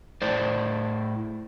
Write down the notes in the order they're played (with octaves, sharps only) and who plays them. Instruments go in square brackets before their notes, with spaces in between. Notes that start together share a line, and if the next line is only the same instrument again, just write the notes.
[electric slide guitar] A2 C5 D5